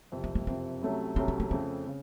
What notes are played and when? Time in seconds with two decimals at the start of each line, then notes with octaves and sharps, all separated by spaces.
0.12 F#1 F2 C3
0.24 C4
0.35 A#3
0.47 F#1 F2 C3 C4
0.82 C2 C3 F#3 A3 C#4
1.16 C2 C3 F#3 A3 C4 C#4
1.28 C4
1.40 A#3
1.51 F2 C#3 A3 C4
1.87 C#3